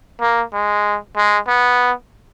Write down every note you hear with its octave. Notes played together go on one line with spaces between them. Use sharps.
A#3
G#3
G#3
B3